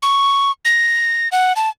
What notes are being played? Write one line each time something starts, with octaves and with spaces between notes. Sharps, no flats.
C#6
A#6
F#5
A5